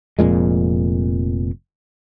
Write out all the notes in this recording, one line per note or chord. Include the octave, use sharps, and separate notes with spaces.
F1 F2 A#2 G#3